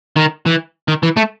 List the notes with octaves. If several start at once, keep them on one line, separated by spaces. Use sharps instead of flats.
D#3
E3
D#3
E3
A3